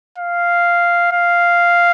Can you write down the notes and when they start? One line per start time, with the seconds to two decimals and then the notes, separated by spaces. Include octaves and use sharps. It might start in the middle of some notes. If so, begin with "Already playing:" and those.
0.18 F5
1.12 F5